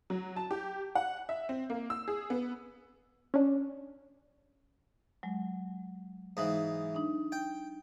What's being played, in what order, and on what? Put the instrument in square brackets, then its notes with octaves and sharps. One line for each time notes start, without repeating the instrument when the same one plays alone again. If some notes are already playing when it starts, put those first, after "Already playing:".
[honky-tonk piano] F#3
A5
G4
F#5
E5
C4
A#3
E6
G#4
B3
[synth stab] C#4 D4
[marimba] F#3 G#3
[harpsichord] G#2 E3 [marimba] D#4 F5
[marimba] D4 D#4
[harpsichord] G5